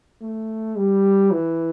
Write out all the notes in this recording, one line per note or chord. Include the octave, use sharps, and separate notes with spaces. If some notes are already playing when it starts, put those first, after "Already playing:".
A3
G3
E3